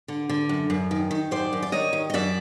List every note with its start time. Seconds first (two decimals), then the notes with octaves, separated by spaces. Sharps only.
0.08 D3
0.29 D3
0.49 F#2
0.70 F#2
0.91 D#3
1.11 D#3
1.31 F#2 C5 D5
1.53 F#2
1.63 D5
1.72 D#3 C#5 D#5
1.93 D#3
2.10 D#5
2.14 F#2 D5 E5